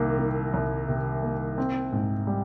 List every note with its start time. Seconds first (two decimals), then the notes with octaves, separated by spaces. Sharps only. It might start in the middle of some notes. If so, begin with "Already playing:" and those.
Already playing: C2 C3 D#3 A#3
0.19 D#3
0.54 C2
0.88 C3
1.22 A#3
1.58 C4
1.92 G#2
2.27 G3